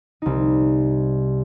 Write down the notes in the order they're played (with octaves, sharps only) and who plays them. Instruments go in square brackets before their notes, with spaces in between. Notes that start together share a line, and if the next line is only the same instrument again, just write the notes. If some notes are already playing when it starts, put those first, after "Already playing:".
[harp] C2 D#4